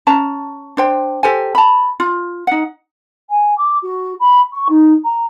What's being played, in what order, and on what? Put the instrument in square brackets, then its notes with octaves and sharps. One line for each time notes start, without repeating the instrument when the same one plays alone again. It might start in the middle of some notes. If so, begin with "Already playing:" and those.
[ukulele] C#4 A5 A#5
D4 C5 G5
G4 A4 C5 G#5
A5 B5
F4
D#4 F#5
[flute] G#5
D6
F#4
B5
C#6
D#4
A#5